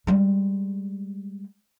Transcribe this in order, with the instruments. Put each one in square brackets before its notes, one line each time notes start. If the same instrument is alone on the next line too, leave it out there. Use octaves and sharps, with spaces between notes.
[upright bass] G3 G#3